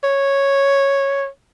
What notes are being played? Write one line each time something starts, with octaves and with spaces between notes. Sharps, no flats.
C#5